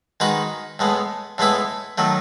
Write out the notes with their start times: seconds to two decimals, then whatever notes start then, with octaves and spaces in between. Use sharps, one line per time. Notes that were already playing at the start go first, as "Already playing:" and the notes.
0.20 D#3 G#3 D#4 F#4 B4
0.79 A2 G#3 B3
1.38 A2 G#3 B3 E4 B4
1.98 D#3 F#3 A3